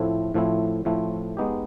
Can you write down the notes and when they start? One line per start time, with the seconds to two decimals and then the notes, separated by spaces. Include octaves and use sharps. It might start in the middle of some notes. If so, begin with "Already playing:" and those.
Already playing: A2 F3 A3 C4 E4
0.34 A2 F3 A3 C4 E4
0.85 A2 F3 A3 C4 E4
1.37 G#3 B3 D#4 G4